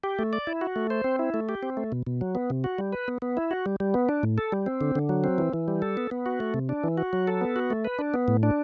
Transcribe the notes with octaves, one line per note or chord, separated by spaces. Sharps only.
G4
A3
D5
E4
F#4
A3
C5
C4
E4
A3
G4
C4
A3
B2
B2
F#3
B3
C3
F#4
G3
B4
B3
B3
E4
F#4
G3
G3
B3
D4
A2
A4
G3
C4
D3
D3
F#3
C4
E3
E3
G3
A4
B3
B3
F#4
A3
C3
D4
E3
F#4
F#3
A4
B3
F#4
A3
B4
D4
B3
A2
D4